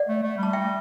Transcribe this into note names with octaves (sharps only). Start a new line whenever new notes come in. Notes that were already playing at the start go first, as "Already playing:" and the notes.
Already playing: D5 F#5
A3
A3
G3 A5
E5 G5